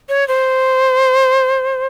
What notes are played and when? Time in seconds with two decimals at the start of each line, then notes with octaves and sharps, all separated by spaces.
0.09 C#5
0.28 C5